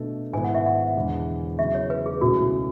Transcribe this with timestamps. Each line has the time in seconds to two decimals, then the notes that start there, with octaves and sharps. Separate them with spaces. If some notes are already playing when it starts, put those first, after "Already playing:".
Already playing: B2 A3 D4 A4
0.33 G#1 G#2 G#3 B3 E4 G#5
0.44 F#5
0.55 E5
0.66 F#5
0.95 E1 E2 D3 G#3
1.59 E2 C#3 F#3 E5
1.75 C#5
1.90 B4
2.06 G#4
2.21 C#2 B2 A3 C#4 E4 F#4